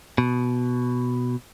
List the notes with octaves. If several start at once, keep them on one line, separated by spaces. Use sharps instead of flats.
B2